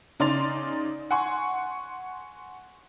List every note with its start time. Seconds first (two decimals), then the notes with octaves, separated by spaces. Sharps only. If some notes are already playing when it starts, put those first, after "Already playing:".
0.20 C#3 D#4 D5 C6 A6 F7
1.11 F#5 G#5 C6 C#6